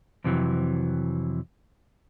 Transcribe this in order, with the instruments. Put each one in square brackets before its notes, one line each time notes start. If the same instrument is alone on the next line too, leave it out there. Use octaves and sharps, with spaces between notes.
[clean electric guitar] F2 C3 E3 F#3